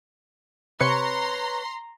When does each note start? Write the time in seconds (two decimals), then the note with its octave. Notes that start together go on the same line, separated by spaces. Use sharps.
0.81 C3 B4 C#5 A#5 C6 C#6 C#7